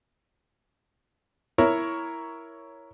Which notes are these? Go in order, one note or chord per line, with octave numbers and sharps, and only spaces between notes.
E4 A#4 C#5